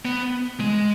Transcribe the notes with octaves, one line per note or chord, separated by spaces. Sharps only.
B3
G#3